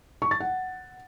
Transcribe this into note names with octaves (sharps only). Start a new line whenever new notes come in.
C#6
A6
F#5